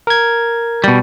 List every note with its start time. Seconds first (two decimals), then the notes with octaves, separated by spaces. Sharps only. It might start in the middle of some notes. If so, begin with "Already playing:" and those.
0.07 A#4 G#6
0.84 B2 G3